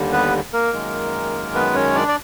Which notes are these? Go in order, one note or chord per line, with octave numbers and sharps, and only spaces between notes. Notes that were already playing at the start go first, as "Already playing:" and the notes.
Already playing: D#2 D3 G3
B3 B4
A#3 A#4
F#2 D#3 G#3
B3 B4
C#4 C#5
D4 D5
D5